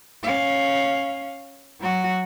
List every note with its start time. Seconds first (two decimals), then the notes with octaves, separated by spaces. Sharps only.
0.23 C#4 F5
1.81 F#3 F#4